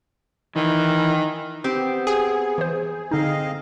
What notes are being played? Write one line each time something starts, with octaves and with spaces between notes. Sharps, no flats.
D#3 E3
B3 C4 G4
G#4
E3 C5
D3 C4 D#4 D#5 F5